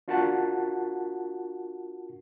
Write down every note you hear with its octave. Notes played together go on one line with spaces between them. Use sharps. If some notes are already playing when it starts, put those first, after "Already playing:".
D4 F4 F#4 A#4 F#5 A5